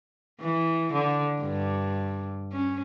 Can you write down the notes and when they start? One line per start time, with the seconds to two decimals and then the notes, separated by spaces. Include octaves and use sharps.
0.40 E3
0.93 D3
1.42 G2
2.52 C#4